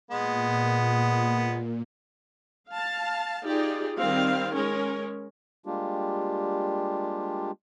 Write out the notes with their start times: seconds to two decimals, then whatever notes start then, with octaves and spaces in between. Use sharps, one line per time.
0.11 A#2 G#3 B3
2.70 F5 A5
3.45 D#4 F4 G4 G#4 D5
3.98 D#3 G3 C4 F5
4.54 G#3 C#4 A#4
5.66 G3 G#3 A#3 D4 F4 G4